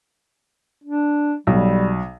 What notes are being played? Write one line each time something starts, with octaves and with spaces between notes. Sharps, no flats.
D4
B1 G3